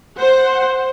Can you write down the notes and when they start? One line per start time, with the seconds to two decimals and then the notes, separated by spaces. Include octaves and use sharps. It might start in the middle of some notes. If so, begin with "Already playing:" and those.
0.18 C5 F#5